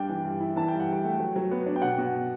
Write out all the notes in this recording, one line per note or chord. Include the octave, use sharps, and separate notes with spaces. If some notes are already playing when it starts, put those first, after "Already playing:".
Already playing: G2 D4 G5
E3
G2
E4
E3 A5
G2 G5
F#5
G2 G5
A3
F#3
F#3
B3
D4
G5
B2 F#5
B2